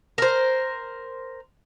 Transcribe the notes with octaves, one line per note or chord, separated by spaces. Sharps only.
A#4 C5